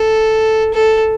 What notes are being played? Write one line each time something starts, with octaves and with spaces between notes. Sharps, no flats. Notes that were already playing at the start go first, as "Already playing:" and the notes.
Already playing: A4
A4